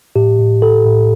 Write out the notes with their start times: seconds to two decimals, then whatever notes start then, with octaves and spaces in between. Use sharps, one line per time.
0.16 A2 G4
0.39 A2
0.62 A2 A4
0.85 A2